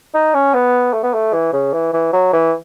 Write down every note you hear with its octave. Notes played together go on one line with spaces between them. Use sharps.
D#4
C#4
B3
A3
B3
A3
E3
C#3
E3
E3
F#3
E3